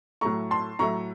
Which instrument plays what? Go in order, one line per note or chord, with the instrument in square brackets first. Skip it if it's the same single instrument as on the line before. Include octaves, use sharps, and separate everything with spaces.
[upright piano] A2 F#3 A3 A#5 C#6
A5 C6
A2 F#3 A3 A#5 C#6